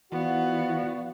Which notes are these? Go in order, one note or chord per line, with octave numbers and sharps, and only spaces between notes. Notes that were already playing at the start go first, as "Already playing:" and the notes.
E3 F3 B3 F#4 D5 F5 C#6